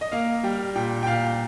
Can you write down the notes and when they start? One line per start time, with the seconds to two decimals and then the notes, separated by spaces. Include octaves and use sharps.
0.01 D#5
0.12 A#3 F5
0.43 G3 G5
0.75 A#2 G5
1.03 G5
1.06 A#2 F5